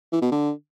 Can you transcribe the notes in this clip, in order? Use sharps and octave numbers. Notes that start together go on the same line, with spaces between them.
E3
B2
D3